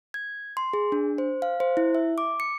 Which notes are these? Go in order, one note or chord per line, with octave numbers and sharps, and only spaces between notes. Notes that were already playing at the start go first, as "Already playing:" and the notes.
G#6
C6
G#4
D4
C5
F5
C5
E4
E5
D6
C#7